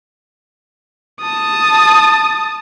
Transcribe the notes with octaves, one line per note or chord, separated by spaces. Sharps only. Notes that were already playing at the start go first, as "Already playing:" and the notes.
A5 D#6